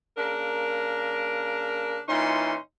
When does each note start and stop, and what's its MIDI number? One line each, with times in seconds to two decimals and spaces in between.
0.17 2.00 49
0.17 2.00 58
0.17 2.00 62
0.17 2.00 70
2.08 2.54 46
2.08 2.54 52
2.08 2.54 61
2.08 2.54 63
2.08 2.54 84